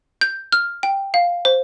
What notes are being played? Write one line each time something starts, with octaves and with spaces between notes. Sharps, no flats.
G6
F6
G5
F5
C5